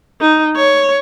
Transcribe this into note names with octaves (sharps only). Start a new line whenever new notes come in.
D#4
C#5